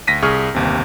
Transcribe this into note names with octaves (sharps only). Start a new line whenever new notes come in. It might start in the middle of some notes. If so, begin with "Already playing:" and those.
D2 A#6 B6 D#7
C2 G#4 C#6 F6
G1 D#2 C3